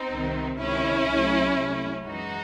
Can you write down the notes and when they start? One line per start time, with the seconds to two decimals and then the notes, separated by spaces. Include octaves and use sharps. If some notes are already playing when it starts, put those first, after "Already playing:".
Already playing: C4 D#4
0.09 C2 C3 D#3
0.58 C#2 C3 D#3 C#4 E4
1.08 C2 C3 F#3 A3
1.57 C2 C3 F#3 A3
2.06 F#2 E3 G#3 D#4 F#4